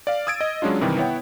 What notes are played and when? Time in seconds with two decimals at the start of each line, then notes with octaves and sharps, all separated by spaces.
0.07 D5 F5
0.27 D#6 E6 G#6 A6 D7
0.41 D#5
0.62 F#3 G#3 C#4 D4 F4
0.81 G2 C3 D#3 E3 G3
0.97 B3 E4 C#5 F#5 G5